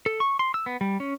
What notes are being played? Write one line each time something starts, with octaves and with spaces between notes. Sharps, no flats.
A4
C#6
C6
E6
B3
G3
C#4